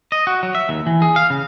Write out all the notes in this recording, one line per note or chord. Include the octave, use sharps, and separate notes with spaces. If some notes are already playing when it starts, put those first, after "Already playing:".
D#5
F#4
F#3
E5
D#2
E3
G#4
F5
C#3